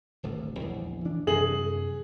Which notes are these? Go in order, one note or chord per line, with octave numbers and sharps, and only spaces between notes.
D1 G#1 D2
A#1 E2
E3 D4
F#2 C3 E3 G#4 F#7